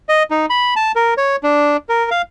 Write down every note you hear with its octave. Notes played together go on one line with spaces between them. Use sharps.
D#5
D#4
B5
A5
A#4
C#5
D4
A#4
F5